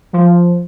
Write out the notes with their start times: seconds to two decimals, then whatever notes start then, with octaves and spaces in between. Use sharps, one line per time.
0.13 F3